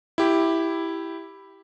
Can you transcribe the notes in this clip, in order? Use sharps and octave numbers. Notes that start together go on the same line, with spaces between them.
E4 G4